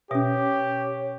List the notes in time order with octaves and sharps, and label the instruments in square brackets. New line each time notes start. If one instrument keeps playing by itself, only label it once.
[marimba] B2 [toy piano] C#4 E5 [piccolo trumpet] G4 [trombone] C#5